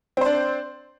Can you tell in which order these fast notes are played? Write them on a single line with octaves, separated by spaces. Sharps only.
C4 C5 D4